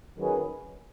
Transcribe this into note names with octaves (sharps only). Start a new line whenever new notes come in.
D#3 F#3 C#4 G#4 B4